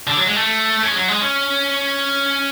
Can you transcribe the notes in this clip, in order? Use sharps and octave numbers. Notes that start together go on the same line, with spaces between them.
D3
F#3
G#3
A3
C#4
G#3
F#3
G#3
C#4